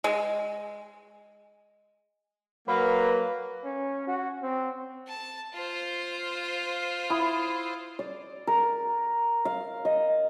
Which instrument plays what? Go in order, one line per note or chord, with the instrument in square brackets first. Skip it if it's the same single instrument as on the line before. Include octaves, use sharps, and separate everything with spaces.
[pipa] G#3
[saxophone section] F#3 A#3 [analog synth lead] B4
[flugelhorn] C#4
F#4
C4
[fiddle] A5
F4 C5
[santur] E4 D#6
[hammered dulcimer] D5
A#4
F5
D#5